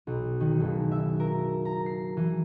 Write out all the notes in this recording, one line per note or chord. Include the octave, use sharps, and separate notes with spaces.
B1
D#3
F#1
E5
A#4
A#5
C7
E3